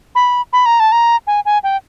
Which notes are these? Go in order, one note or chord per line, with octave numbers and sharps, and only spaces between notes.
B5
B5
A#5
A5
A#5
G#5
G#5
G5